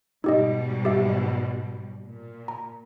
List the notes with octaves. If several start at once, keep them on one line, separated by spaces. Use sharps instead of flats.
G#2 B2 G3 D#4 G4 D#5
G4 E5
A#2
A#5